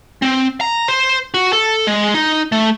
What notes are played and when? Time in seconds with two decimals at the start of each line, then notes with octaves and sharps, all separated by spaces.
0.22 C4
0.61 A#5
0.88 C5
1.34 F#4
1.53 A4
1.87 G#3
2.14 D#4
2.52 A3